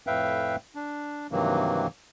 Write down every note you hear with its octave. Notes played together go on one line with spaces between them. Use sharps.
F2 A2 B4 E5 F5 G5
D4
G2 C3 D#3 E3 F#3 A#3